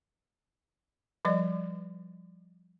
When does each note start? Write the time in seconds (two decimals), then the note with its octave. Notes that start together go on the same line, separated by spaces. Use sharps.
1.25 F3 G3 D5 D#5